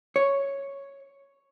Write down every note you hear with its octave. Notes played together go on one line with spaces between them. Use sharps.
C#5